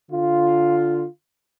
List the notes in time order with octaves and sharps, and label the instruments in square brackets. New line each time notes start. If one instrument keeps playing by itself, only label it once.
[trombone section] D3 F4